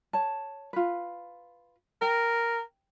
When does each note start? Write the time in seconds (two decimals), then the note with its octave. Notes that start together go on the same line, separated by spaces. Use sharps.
0.13 C#5 A5
0.73 F4 B4
2.02 A#4 G5